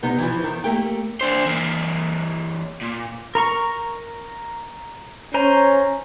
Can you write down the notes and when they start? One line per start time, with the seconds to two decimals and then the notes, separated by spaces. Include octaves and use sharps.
0.03 C3 B3 D#4
0.18 E3 F3
0.44 E2 D#3
0.64 A3 A#3 G4
1.21 D4 C5
1.46 E3 A#3
2.81 A#2
3.35 A#4 A#5 C#6
5.34 C#4 C5 G#5 A#5